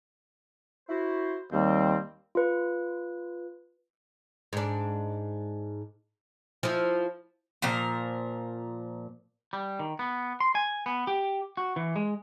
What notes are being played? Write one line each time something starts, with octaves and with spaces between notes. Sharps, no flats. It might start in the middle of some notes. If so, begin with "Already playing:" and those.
E4 F#4 C5
D#2 G3 C4
F4 B4
G#2 D4
F3 E4
A#2 F3 A#4
G3
D#3
B3
C6
G#5
B3
G4
F#4
E3
G#3